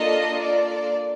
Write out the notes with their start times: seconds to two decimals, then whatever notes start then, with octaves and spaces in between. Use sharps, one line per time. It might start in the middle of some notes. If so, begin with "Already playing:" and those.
Already playing: A#3 D4 F4 A4 D#5
0.42 D5